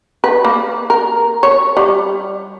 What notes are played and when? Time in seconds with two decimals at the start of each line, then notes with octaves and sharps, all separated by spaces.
0.24 B4
0.44 A#3
0.90 A#4
1.43 C#5
1.77 G3